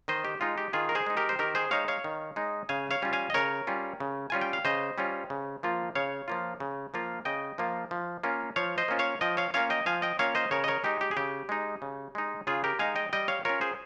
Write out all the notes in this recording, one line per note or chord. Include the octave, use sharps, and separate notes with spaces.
D#3 C5 D#5
G4
G#3 D#4 F4
G4
D#3 F4 G#4
A#4
G#4 C5
G#3 D#4
G4 A#4
C5
D#3 G4 A#4
G#4 C5
G#3 D#4 C#5 F5
C#5 F5
D#3
G#3 D#4
C#3 F5 G#5
C#5 F5
G3 C#4 F4
F5 G#5
D#5
C#3 A#4 C#5
G3 C#4 F4
C#3
G3 C#4 F4 G#5
G5
F5
C#3 C5 D#5
G3 C#4 F4
C#3
F3 A#3 F4
C#3 C#5 F5
F3 A#3 F4
C#3
F3 A#3 F4
C#3 D#5 G5
F3 A#3 F4
F3
A#3 C#4 F4
F3 C#5 F5
C5 D#5
A#3 C#4 F4
C#5 F5
F3 D#5 G5
C#5 F5
A#3 C#4 F4 C#5 F5
D#5 G5
F3 F5 G#5
D#5 G5
A#3 C#4 F4 C#5 F5
C5 D#5
C#3 A#4 C#5
D#5
A#4 C#5
G#3 D#4 G4
G4
G#4
C#3 G4
G#3 D#4
C#3
G#3 D#4
C#3 F4 G#4
G4 A#4
G#3 D#4 F5 G#5
D#5 G5
G3 D#5 G5
C#5 F5
C#4 F4 A#4 C#5
G#4 C5